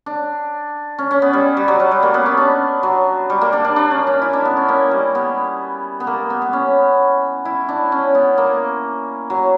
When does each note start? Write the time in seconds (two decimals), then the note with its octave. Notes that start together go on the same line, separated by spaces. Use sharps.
0.06 D4
0.99 C#4
1.11 C#4
1.22 B3
1.33 G3
1.57 G3
1.68 F#3
1.80 F#3
1.91 G3
2.03 A#3
2.14 B3
2.26 C#4
2.37 D4
2.83 F#3
3.30 G3
3.41 A#3
3.53 D4
3.65 D4
3.76 D4
3.91 C#4
4.07 C#4
4.22 E4
4.33 D4
4.45 B3
4.57 C#4
4.68 A#3
4.91 G3
5.15 B3
6.00 B3
6.07 A#3
6.30 B3
6.42 B3
6.53 C#4
7.45 E4
7.69 D4
7.92 C#4
8.15 B3
8.38 A#3
9.30 F#3